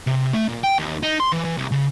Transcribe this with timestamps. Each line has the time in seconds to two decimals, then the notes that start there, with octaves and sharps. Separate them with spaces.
0.07 C3
0.33 A3
0.48 A#2
0.63 G5
0.78 D#2
1.03 D#4
1.20 C6
1.32 E3
1.45 E3
1.57 C2
1.72 C#3